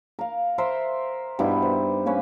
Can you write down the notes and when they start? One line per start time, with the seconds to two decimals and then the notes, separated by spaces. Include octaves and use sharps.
0.19 A#4 F5
0.58 A#4 C5 E5 C6
1.39 G2 B2 D#4 E4
1.62 C5
2.06 A#3 C#4 B4